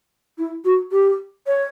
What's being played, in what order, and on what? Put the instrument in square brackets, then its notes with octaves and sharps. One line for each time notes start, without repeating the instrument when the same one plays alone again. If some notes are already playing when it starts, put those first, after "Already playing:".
[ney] E4
F#4
G4
C#5